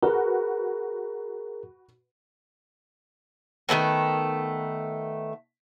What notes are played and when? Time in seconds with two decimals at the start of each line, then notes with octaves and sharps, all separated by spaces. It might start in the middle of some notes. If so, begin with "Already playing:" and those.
0.03 F#4 G#4 A#4 B4
3.69 D#3 G#3 A3 B3